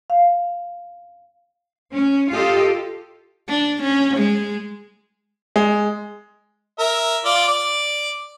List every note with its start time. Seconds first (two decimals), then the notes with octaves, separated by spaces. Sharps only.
0.10 F5
1.94 C#4
2.32 F4 G4 A4 D#5
3.48 D4
3.82 C#4
4.17 G#3
5.56 G#3
6.79 A#4 E5
7.25 F4 D5
7.48 D5